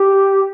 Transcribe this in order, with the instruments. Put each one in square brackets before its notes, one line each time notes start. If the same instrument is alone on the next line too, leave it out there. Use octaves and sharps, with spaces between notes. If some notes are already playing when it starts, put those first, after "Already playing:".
Already playing: [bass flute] G4